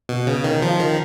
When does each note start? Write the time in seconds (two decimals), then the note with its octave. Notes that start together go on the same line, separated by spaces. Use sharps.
0.09 B2
0.27 C#3
0.44 D#3
0.62 F3
0.80 D#3